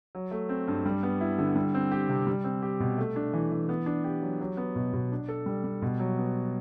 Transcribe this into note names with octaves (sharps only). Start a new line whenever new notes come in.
F#3
A3
C4
G2
G3
B3
E4
D3
G3
C4
G4
C3
G3
C4
G4
B2
A3
D4
E3
E3
B3
D4
G4
F#3
F#3
B3
B2
B2
D4
A4
G3
G3
B2
F#3
B3